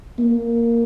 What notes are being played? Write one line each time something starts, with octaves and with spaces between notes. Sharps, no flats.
A#3